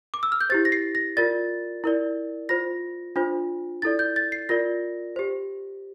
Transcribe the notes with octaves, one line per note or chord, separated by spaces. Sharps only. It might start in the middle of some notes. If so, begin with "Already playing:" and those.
D6
E6
F6
G6
E4 G4 C5 A6
A#6
C7
A#6
F4 A#4 D5 A6
E4 A#4 D5
F4 C5 A#6
D4 F4 C5
E4 A4 D5 A6
G6
A6
C7
F4 A#4 D5 A#6
G4 C5